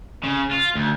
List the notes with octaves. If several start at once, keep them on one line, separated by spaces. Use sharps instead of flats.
C#3
F4
D2